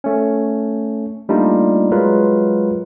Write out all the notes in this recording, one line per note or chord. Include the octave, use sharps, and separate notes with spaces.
A3 C#4
G3 A3 A#3 D4 D#4 F4
F#3 G#3 F4 A#4 B4